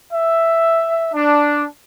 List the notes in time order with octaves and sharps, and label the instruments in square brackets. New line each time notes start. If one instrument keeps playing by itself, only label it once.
[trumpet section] E5
D4